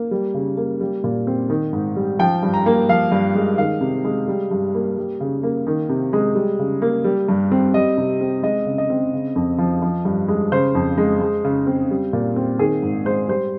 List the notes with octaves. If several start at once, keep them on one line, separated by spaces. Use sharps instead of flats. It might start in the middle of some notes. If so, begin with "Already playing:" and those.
Already playing: A#3
G3
C#3
A#3
G3
A#2
C4
D#3
G#2
G3
F3 G5
G2
A#5
A#3
F3 F5
G2
G#3
D#3 F5
C3
G#3
G3
G2
A#3
G3
C#3
A#3
D#3
C3
G#3
G3
C#3
A#3
G3
G2
C4
G3 D#5
C3
C4
G#3 D#5
C#3
D#5
C4
C#3
F2
F3
F3
G2
G#3
C#3 C5
F2
G#3
G#3
C#3
C4
G3
A#2
C4
D#3 G#4
G#2
G#3 C5
G3 C5